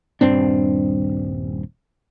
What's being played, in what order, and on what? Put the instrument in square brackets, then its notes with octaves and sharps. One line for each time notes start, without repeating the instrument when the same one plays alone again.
[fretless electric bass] D#1 G2 C4 D4